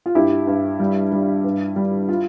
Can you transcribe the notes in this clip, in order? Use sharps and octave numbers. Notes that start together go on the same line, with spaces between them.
F4
G2 E4 G4
G2
G3
G3
G2
G3
F4